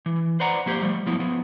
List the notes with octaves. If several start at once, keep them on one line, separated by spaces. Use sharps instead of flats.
E3
B4 C5 D5 F#5 A#5
F3 A#3 G4 C5
F3 G3 A3
F3 F#3 B3 E4
F3 B3